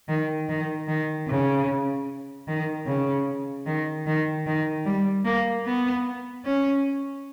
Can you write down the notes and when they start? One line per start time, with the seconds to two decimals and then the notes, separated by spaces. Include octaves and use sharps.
0.09 D#3
0.49 D#3
0.88 D#3
1.28 C#3
2.48 D#3
2.86 C#3
3.66 D#3
4.06 D#3
4.47 D#3
4.86 G3
5.25 A#3
5.66 B3
6.45 C#4